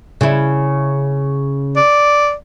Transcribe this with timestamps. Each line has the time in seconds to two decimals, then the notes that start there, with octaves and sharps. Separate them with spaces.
0.21 C#3 E4
1.76 D5